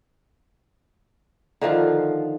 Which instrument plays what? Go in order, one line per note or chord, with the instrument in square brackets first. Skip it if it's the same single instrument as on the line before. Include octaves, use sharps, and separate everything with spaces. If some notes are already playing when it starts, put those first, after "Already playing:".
[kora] D3 D#3 F3 F4